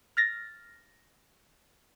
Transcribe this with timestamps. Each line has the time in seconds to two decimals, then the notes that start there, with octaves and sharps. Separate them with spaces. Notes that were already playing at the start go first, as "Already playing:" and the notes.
0.17 F6 A6 A#6